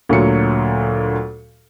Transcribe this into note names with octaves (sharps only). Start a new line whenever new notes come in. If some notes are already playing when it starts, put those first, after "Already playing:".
D2 A#2 F#3 C#7